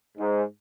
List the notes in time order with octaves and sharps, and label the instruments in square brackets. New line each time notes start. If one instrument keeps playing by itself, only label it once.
[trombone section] G#2